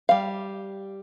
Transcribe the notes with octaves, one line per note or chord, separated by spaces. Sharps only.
G3 F5